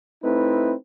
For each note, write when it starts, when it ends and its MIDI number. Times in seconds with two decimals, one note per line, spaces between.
0.22 0.72 57
0.22 0.72 60
0.22 0.72 63
0.22 0.72 64
0.22 0.72 71